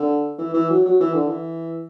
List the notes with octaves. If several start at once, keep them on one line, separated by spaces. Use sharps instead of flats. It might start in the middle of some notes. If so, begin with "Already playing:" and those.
Already playing: D3
E3
E3
F#3
F#3
E3
D3
E3